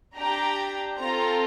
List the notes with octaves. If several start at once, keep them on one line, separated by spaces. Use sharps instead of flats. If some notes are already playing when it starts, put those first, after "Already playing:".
D4 G4 A#5
C4 F4 A4 A#5